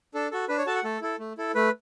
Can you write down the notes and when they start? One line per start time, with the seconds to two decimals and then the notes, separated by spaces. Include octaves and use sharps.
0.14 D4 A4
0.31 F#4 A4
0.49 D4 B4
0.58 C#5
0.66 F#4 A4 A5
0.76 F#5
0.84 A3 A4
1.01 E4 A4
1.19 A3
1.38 E4 A4
1.55 A3 B4